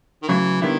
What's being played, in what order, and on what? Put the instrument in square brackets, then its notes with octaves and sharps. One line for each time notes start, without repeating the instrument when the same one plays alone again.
[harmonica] D#3
[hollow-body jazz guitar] C#3 F#3 A3 [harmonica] E3
[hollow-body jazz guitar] D3 G3 B3 E4 [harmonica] D#3